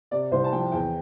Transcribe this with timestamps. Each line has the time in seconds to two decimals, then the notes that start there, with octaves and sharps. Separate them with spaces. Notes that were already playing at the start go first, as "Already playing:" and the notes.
0.11 C3 D5
0.31 C2 C5
0.44 A5
0.52 F3 G5
0.72 E2 G5